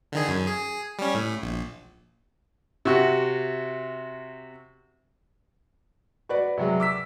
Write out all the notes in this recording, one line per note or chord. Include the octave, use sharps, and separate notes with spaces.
D3 D#3 G#4
F#2
G#4
G3 C#4
A2
A#1
C3 F#4
F#4 B4 D5
C3 F#3 G#3
D6 E6 B6